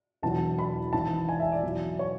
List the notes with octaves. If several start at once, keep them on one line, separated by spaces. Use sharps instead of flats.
E1 E2 B2 F#3 A5
B5
G#1 G#2 E3 A5
G#5
E5
D5
E2 B2 F#3
C#5